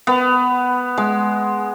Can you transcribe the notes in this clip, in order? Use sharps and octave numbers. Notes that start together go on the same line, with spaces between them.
B3
G#3